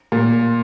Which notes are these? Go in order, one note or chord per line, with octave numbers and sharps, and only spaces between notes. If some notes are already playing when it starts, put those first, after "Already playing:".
A#2